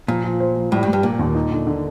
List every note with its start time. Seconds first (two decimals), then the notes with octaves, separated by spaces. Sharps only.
0.08 A#2 F3
0.24 F3
0.40 C5
0.56 F3
0.72 A2 G3
0.83 G2
0.88 G3
0.93 G2
1.03 A#2 A#3
1.19 D#2
1.35 D#4
1.51 D3
1.67 D3